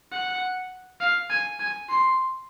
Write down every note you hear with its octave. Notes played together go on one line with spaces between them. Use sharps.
F#5
F5
G#5
G#5
C6